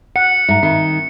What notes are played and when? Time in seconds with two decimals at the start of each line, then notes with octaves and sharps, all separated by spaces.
0.16 F#5 C#7
0.48 G#2 E5 A#5
0.63 D#3 C4 E5